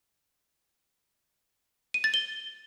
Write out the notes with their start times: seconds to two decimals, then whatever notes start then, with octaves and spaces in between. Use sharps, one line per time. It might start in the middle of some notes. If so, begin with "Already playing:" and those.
1.94 D#7
2.04 A6
2.14 G7